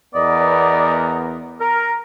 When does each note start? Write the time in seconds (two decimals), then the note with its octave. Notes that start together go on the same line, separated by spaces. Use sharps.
0.15 E2 B3 A#4 D5 D#5
1.60 A#4